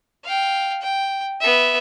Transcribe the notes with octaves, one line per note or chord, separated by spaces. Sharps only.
F5 G5
G5
B3 E5